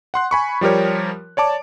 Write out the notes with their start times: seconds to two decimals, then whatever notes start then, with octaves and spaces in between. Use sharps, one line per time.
0.14 F#5 C6 F#6
0.31 G#5 B5 C#6
0.61 F3 G3 G4 A#4 C#5
1.37 C#5 D5 A5 D6